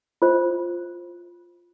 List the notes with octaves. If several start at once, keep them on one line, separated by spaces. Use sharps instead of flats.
F4 C5